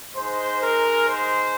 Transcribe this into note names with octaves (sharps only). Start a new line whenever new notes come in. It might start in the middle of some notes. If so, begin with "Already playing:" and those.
G#3 D#4 C5
A#4
C5